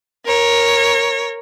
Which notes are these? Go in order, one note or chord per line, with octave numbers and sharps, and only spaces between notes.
A#4 C#5